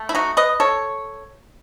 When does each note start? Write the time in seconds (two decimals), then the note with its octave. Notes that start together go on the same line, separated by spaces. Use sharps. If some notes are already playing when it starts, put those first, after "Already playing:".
Already playing: A3
0.09 E4
0.15 D#4 F#4
0.37 B4 D#5
0.60 A4 C#5